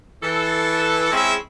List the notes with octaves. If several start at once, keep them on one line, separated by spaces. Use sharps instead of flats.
E3 A4
G#3 C4 C#4 E4 G#4 E5